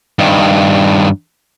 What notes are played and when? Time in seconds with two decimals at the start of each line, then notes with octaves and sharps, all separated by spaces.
0.19 G2 D#3